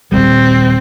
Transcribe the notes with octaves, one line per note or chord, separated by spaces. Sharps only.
D#1 G#1 G3 C4